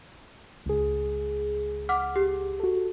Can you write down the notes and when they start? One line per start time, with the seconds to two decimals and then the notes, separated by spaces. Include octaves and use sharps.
0.66 C#2 G#4
1.89 F#5 D6 F6
2.16 G4
2.60 F#4 A4